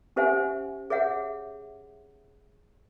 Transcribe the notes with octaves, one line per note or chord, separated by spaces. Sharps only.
C#4 G4 C5 E5 F#5 G#5
G#4 C#5 E5 F#5